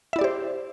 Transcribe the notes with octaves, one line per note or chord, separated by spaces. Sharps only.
E4 G4 C5 D5 E5